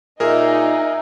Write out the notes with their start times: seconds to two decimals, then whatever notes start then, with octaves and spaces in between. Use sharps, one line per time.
0.20 A#2 D#4 G#4 A#4 E5 G#5 E6